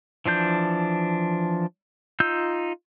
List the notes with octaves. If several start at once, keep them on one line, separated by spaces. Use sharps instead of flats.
E3 F3 D4 G6
D#4 F4 E6 G6